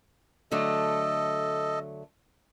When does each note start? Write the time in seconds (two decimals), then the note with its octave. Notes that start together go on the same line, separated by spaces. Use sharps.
0.51 D3 F#3 A3 A4 D#5